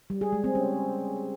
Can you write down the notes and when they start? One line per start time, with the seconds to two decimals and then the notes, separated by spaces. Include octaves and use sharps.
0.10 G3
0.21 G#4
0.33 G#3
0.44 C4
0.55 C#4